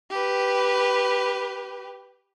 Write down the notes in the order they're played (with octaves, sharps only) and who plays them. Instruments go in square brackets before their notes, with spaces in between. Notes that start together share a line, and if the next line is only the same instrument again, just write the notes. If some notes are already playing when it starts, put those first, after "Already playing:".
[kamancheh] G4 B4